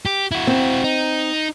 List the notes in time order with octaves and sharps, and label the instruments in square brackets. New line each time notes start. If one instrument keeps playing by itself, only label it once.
[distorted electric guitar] G4
E4 F#4
[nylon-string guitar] C4
[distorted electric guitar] D#4